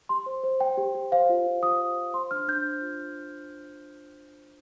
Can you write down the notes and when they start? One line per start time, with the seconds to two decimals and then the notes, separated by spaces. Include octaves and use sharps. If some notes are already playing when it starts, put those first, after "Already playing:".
0.09 G4 C6
0.26 C5
0.44 C5
0.60 C5 G5
0.77 G4
0.95 G4
1.12 C5 F5
1.29 F4
1.46 F4
1.63 F4 D#6
1.80 C5
1.98 C5
2.13 C5 C6
2.31 D4 F6
2.48 D4 G6
2.65 C5
2.82 F4